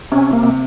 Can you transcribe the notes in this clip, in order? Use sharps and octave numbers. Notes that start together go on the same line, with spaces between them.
C3 C#4
A#3
C3